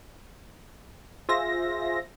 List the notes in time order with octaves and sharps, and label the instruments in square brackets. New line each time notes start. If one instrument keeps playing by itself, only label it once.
[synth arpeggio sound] F4 G#4 C5 E5 A#6